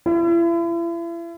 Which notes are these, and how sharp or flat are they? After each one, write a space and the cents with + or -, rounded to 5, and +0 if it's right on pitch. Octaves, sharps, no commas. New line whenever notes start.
E4 +40